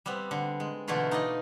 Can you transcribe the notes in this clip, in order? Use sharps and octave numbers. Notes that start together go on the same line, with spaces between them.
G3 B3 C4
D3
G#3
B2 D3 E3 A3 E4 F4
D#4 D5 D#5